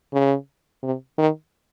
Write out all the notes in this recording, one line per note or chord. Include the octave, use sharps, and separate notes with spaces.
C#3
C3
D#3